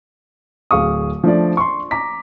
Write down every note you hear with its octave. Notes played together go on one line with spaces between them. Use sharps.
D1 G#4 F5 C#6 D#6
F3 A3 D4 D5
C6 C#6
A#5 D6 B6